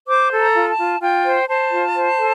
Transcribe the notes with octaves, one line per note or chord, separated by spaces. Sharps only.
C5 D6
A4
A#5
F4
A5
F4
F4 G5
C5
C5 A5
F4
C5
A4